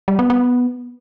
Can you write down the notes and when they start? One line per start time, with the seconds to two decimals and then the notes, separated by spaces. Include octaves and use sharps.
0.08 G3
0.19 B3
0.30 B3